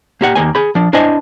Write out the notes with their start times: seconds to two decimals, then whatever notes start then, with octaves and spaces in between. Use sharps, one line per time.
0.21 A#3 G4 F#5
0.35 D#2 E3 A#3 G#5
0.55 G#4 B5
0.75 F3 D4
0.93 D4 E4 C5 D#5 G#5